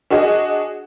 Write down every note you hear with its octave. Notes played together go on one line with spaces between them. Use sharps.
D4 F#4 G#4 D#5